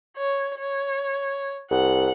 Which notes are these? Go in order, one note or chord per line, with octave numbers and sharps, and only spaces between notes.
C#5
C#5
C2 F#5